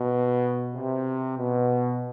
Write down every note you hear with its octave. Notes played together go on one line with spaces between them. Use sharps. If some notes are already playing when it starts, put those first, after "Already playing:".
Already playing: B2
C3
B2